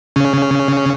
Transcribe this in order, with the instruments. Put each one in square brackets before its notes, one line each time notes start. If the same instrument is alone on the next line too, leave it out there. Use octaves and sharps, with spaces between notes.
[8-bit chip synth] C#3 C#4